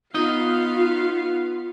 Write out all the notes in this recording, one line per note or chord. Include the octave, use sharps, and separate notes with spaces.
B3 D#4 F4 D#5 F5